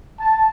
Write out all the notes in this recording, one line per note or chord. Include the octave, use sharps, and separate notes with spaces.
A5